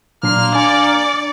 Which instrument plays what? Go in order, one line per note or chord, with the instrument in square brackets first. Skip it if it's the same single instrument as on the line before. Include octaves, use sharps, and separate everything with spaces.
[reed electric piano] A#2 [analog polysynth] F#3 D4 C6 [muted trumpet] A#3 [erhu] F6
[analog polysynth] D4 C#7 [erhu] D5 [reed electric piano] G#5